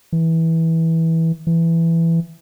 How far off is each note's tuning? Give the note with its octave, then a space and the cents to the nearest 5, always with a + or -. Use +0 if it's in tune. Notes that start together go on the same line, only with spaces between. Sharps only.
E3 -15
E3 +10